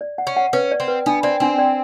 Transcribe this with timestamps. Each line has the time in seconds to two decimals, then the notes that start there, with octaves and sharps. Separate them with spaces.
0.01 D5
0.18 F#5
0.27 C#4
0.37 F#5
0.53 C#4 B4
0.72 D5
0.80 C4
0.88 B4
1.06 B3 D4
1.23 C4 D5
1.40 C4 D4
1.59 D5